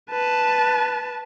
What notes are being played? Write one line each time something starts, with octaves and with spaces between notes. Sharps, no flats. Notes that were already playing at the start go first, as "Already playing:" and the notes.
B4 A5